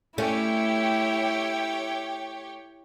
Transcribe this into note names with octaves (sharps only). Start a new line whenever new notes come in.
A3 C#4 E4 G4 C#5 G5